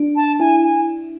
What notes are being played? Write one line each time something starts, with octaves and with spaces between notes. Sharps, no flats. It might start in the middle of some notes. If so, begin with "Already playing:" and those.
Already playing: D4
A5
E4 G#5
G#5